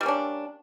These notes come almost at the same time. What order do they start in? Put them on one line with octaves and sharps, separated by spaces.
G3 A#3 C#4 D4